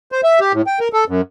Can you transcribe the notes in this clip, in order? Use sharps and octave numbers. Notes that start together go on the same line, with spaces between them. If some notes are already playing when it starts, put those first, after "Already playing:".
C5
E5
G4
A2
G5
A#4
A4
F#2